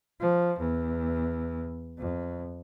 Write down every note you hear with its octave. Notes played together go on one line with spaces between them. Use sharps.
F3
E2
F2